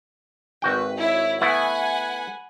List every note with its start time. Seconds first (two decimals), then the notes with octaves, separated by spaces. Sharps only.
0.62 G#1 F#4 B4 G5
1.00 E4 C#5
1.41 A3 B3 E4 F#5 G#5 B5